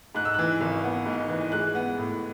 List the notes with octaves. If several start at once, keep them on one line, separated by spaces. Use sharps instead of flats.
G#2 F#6
E6
E3 F#6
G#1
B3
G#2
E3
G#3 F#6
B3
A2